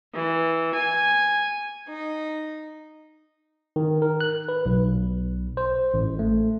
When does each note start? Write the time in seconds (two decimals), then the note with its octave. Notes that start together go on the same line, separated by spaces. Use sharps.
0.14 E3
0.74 G#5
1.88 D#4
3.76 D#3
4.02 A#4
4.21 F#6
4.49 B4
4.66 B1
5.57 C5
5.94 A1
6.19 A3